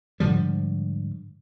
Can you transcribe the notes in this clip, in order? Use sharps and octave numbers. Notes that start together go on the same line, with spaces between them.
G#2 D3 F3 G3